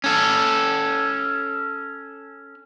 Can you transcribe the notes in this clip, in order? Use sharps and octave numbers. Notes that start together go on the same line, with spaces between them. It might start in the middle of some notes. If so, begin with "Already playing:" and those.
C#4 A4